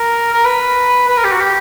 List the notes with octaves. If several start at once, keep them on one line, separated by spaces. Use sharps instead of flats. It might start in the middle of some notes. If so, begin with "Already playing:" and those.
Already playing: A#4
A#4
B4
B4
A#4
G4
F#4
G4